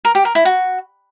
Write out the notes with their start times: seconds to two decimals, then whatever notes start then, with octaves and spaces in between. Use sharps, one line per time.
0.05 A#4
0.15 G4
0.25 A#4
0.35 E4
0.45 F#4